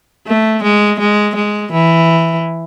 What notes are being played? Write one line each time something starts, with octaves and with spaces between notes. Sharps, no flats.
A3
G#3
G#3
G#3
E3